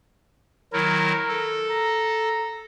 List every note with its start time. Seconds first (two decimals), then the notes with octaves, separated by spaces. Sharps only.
0.73 D#3 F#3 E4 A#4
1.28 A4
1.70 A#5